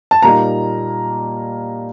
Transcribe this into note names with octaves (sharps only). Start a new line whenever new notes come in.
A5
A#2 G3 A#3 D#4 A#5